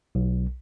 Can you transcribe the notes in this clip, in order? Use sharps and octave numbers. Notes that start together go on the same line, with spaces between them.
B1